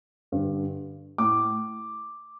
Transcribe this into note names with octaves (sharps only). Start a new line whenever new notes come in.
G2 D3
A2 D6